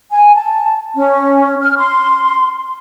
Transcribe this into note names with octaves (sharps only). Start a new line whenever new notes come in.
G#5
A5
C#4
F6
C6